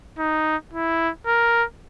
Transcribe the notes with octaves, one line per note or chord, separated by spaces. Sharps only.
D#4
E4
A#4